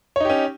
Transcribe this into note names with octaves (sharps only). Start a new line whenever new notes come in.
C#4 D#4 G4 C#5